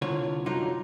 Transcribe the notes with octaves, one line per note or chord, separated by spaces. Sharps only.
C2 D3 F4 C#5
F#2 D3 F#3 D#4 F4